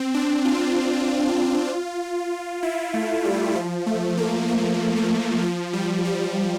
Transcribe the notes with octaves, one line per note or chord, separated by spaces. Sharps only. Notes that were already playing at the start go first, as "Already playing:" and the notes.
Already playing: C4
D4
F4
E4
A3
G3
F3
A3
A#3
A#3
A3
F3
G3
G3